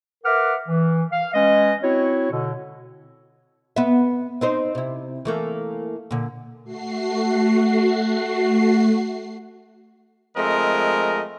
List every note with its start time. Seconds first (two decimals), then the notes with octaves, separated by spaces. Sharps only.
0.24 A#4 B4 E5 F#5 D6 F6
0.68 E3
1.12 F5
1.34 G#3 C#4 B4 D#5
1.83 C4 E4 F#4 C#5
2.31 B2 D3
3.76 B3 E5
4.41 C4 D#4 C5
4.75 C3 E4
5.25 E3 A3 A#3
6.11 A#2 D3
6.64 A3 F#4 C7
10.37 F3 G#3 A3 C4 A#4 D#5